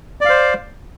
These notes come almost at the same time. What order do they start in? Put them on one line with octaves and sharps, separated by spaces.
D5 F5 C5